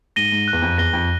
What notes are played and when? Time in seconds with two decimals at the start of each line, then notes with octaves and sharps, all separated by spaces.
0.16 G#2 A#6 D#7 G7
0.32 G#2
0.48 F#6
0.53 E2
0.62 F2
0.78 E2 A#6 D#7 G7
0.93 F2